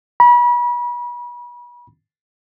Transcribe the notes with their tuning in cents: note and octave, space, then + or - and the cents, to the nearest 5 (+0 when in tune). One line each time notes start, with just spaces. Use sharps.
B5 -35